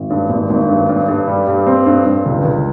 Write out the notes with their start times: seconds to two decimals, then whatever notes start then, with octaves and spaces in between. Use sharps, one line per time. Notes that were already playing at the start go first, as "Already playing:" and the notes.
Already playing: G#1
0.10 G2
0.29 G#1
0.50 G#1
0.69 G2
0.89 G2
1.08 G2
1.27 G3
1.47 G2
1.67 C4
1.87 G2
2.05 G2
2.26 C#2
2.45 C#2